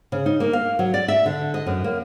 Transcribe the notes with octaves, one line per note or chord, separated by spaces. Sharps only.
C#3
D#4
A#3
F5
F#3
D5
E5
D3
D#5
F#2
A#3